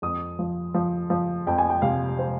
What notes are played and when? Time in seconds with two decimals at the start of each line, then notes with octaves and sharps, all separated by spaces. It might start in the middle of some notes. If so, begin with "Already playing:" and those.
0.02 F2 D#6
0.39 F3
0.74 F3
1.10 F3
1.47 F2 G5
1.58 G#5
1.70 G5
1.82 C3 F5
2.19 C5